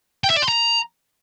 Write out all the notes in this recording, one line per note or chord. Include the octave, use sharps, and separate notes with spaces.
G5
E5
D5
C6
A#5